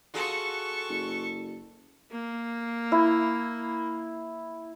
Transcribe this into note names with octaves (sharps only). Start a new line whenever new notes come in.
F4 F#4 G#4 A4 C#6
F#1
A#3
E4